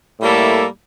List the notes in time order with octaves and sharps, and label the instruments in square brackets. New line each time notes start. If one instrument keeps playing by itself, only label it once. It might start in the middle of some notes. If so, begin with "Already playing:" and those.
[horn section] A2 G3 A#3 E4 A4